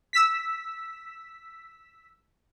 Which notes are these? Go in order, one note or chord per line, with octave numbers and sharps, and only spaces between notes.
E6 B6